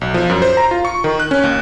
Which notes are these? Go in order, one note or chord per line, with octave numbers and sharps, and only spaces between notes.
B1
F3
F#2
C5
A#5
F4
C#6
D#3
F#6
C#4
D#2